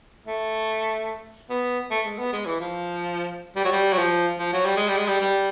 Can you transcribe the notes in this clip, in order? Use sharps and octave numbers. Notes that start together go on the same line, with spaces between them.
A3
B3
A3
G#3
B3
G#3
E3
F3
G3
F#3
G3
F#3
F3
F3
F#3
G3
G#3
G3
G#3
G3
G3